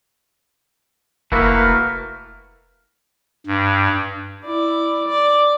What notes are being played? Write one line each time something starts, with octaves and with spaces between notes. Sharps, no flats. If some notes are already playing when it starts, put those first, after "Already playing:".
F1 A3 A#3 E4 F#4 A#4 B4
G2
E4 D5
D5